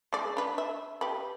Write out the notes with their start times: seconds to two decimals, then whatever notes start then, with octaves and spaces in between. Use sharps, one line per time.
0.13 G#3 D5
0.37 D4 B4
0.58 E5
1.01 G4 B4